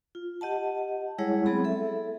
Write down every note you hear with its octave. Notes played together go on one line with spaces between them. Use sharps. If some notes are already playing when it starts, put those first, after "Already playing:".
F4
G4 D#5 F#5 A5
G3 G#3 E4 G#4 C#5 F#5
F#3 B3 C4 G#4 B5
A4 E5